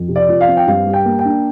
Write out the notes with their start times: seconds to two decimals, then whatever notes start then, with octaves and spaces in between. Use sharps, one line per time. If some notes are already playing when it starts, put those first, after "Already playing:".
Already playing: F2
0.08 C3
0.16 D5
0.29 F3
0.41 F5
0.48 C4
0.57 G5
0.67 G2 F5
0.87 G3
0.94 G5
1.05 A#3
1.19 G5
1.25 D4